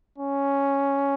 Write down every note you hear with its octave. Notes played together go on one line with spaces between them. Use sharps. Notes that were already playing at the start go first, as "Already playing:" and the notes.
C#4